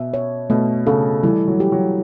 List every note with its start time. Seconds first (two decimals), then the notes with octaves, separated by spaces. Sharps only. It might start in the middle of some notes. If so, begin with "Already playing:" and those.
Already playing: B2 E5
0.14 C#5
0.50 B2 A3
0.87 C#3 A4
1.23 E3 G3
1.48 F#3
1.60 G4
1.72 F#3